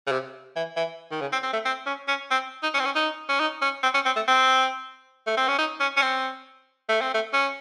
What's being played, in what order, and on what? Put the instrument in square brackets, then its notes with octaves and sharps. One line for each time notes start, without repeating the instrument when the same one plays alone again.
[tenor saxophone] C#3
C3
E3
E3
D#3
C#3
C4
C4
A3
C4
C#4
C#4
C4
D#4
C#4
C4
C#4
D#4
C#4
D#4
C#4
C4
C#4
C4
A3
C4
A3
C4
C#4
D#4
C#4
C#4
C4
A3
C4
A3
C#4